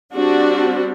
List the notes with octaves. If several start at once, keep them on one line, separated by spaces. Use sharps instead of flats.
G3 C4 D4 F#4